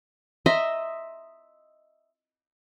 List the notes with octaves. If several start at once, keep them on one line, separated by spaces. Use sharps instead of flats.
D#5 E5 A#5 C6